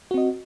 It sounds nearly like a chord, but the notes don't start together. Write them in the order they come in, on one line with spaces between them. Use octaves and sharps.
F#4 C4 D#5